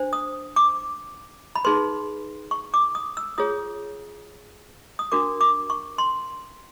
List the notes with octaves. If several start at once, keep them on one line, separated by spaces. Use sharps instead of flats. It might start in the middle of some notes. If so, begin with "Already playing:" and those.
Already playing: D4 C5
D#6
D6
B5
D#4 G#4 B4 C6
C#6
D6
D#6
E6
F4 G#4 C#5 D#6
D#6
D4 F#4 A#4 D6
D6
C#6
C6